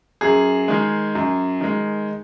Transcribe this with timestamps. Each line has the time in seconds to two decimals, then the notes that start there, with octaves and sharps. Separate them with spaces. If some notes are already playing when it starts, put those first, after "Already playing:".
0.21 F#2 G#4
0.68 D#3 G#3
1.15 F#2
1.61 D#3 G#3